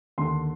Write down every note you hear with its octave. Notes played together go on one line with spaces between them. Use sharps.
D#2 D3 C6